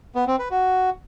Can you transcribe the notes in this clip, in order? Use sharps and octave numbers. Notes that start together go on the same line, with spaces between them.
B3
C4
B4
F#4